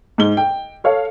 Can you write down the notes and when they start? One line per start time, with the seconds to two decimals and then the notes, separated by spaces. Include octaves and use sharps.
0.18 G#2 G7
0.37 G5
0.84 A4 C#5 F5